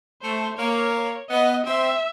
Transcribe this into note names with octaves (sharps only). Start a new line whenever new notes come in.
A3 C5
A#3 C#5
B3 D#5
C4 E5